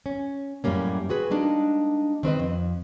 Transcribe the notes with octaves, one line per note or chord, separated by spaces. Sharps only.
C#4
F#2 A2 G3 A#3 C#4
C4 F#4 G#4 B4
G3 G#3 A#3 D4 D#4
D#3 C4 B4 D#5
F2